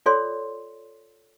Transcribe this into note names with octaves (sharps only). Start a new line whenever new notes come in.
F4 A4 C#5 D5 C6